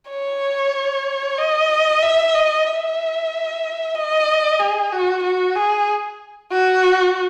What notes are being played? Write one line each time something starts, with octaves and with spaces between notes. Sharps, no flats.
C#5
D#5
E5
D#5
E5
D#5
G#4
F#4
F#4
G#4
F#4